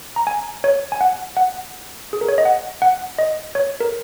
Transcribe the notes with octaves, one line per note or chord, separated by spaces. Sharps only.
A#5
G#5
C#5
G#5
F#5
F#5
G#4
A#4
C#5
D#5
F#5
F#5
D#5
C#5
A#4